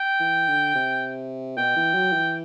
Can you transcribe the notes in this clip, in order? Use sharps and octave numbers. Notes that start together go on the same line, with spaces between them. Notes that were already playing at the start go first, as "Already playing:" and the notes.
Already playing: G5
E3
D3
C3
B2 G5
E3
F#3
E3